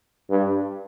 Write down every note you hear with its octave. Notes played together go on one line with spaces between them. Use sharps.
G2